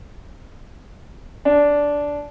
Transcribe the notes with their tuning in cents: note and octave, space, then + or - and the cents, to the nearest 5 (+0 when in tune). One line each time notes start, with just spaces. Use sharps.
D4 -10